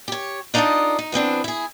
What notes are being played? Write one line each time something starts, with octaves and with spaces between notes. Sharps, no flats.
G4 C#5
D4 D#4 F4 A4 D5 D#5
D#4
E3 B3 C4 D4
E4 G#4